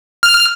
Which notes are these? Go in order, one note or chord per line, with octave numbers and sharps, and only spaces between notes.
F6